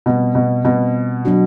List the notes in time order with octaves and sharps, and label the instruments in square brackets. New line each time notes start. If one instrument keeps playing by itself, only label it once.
[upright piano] B2 [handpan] G3 C4 F4
[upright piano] B2
[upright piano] B2 [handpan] G3 C4 F4
[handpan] F#3 A#3 D4 F#4